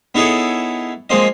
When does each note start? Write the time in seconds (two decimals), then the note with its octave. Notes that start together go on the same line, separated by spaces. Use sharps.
0.15 B3 D#4 E4 G#4 A4 C#5
1.10 F3 G#3 A#3 C4 D#5